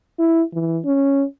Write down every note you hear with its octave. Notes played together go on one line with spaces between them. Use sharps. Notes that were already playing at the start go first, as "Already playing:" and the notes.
E4
E3
C#4